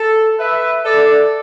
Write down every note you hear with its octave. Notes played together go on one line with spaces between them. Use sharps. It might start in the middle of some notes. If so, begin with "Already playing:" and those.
Already playing: A4
B4 E5
A4 D5